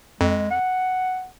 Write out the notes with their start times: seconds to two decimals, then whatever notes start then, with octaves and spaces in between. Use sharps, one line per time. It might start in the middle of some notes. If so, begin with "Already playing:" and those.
0.21 F2 G#3
0.51 F#5